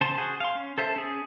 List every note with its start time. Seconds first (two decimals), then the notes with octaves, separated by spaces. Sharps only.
0.01 C#3 C5 A5 C6
0.18 F#4 G#4 C5
0.40 F5 C6
0.55 C#4
0.78 A4 C5 E5 A5
0.96 C#4 G#4